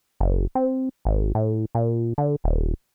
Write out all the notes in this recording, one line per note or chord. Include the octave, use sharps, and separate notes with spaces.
F#1
C4
G#1
A2
A#2
D3
D#1